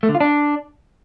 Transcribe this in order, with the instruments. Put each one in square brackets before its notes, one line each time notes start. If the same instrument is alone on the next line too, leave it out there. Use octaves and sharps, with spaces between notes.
[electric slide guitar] A3
D3
F4
D4